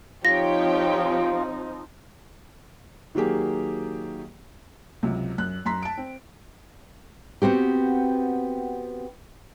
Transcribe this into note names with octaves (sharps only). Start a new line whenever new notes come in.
F3 C4 D#4 F4 G4 C#5 G5 A#6
D#3 F#3 A#3 G4 G#4
C#2 C3 F#3
F#2 F#6
F#2 A#5 C6 B6
A5 D7
C4
B3 C4 F#4 G4